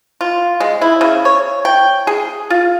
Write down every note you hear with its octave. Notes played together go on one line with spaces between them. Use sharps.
F4
G#3
E4
C#3
C#5
G5
G#4
F4